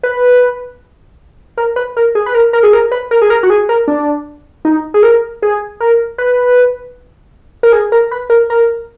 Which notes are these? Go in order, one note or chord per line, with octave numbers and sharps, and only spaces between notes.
B4
A#4
B4
A#4
G#4
B4
A#4
A#4
G#4
A#4
B4
A#4
G#4
A#4
F#4
G#4
A#4
D4
D#4
G#4
A#4
G#4
A#4
B4
A#4
G#4
A#4
B4
A#4
A#4